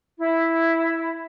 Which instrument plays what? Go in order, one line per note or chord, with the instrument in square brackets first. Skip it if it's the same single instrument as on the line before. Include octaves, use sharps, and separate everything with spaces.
[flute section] E4